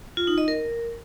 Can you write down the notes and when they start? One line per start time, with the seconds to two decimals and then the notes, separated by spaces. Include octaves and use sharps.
0.17 F4
0.27 D#4
0.38 D#5
0.48 A#4